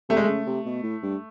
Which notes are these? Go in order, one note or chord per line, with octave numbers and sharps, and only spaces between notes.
C3 A3
G#3
C#3 A3
C3
B2
A2
G2